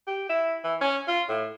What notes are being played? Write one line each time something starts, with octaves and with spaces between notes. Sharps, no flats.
G4
E4
E3
C#4
F4
A2